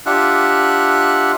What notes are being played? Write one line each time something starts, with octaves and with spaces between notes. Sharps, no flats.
D4 F4 G4 E5 F#5 F#6